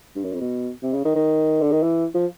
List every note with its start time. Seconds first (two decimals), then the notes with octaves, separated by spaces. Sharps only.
0.16 G2
0.24 F#2
0.33 F2
0.41 B2
0.83 C3
0.93 C#3
1.05 D#3
1.15 D#3
1.61 D3
1.72 D#3
1.82 E3
2.14 F3